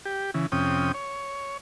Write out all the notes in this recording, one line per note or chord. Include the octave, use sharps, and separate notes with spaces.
G4
C#3 E3
F2 C3 C#4 G5 D#6
C#5